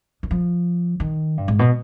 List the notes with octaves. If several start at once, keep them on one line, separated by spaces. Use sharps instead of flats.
D#3
F3
D#3
G2
G#2
B2